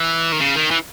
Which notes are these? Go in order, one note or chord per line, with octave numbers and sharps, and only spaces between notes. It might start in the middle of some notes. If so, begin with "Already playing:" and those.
Already playing: E3
D#3
C#3
D#3
E3